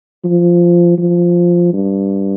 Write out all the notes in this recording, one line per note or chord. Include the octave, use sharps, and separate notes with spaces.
F3
F3
G2